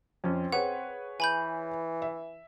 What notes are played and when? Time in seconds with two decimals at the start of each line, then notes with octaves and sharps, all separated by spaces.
0.24 F2 C4 C#4
0.52 G#4 B4 C#5 F#5
1.20 E3 G#5 B5 G6
2.02 E5